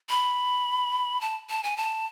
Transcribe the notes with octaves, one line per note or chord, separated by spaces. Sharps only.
B5
A5
A5
G#5
A5